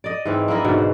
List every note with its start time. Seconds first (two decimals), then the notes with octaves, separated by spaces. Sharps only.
0.04 D5 D#5
0.25 G#2 E3 C4
0.48 A#3 D4 E4 D#5
0.64 G#2 B2 D3 E3
0.78 C5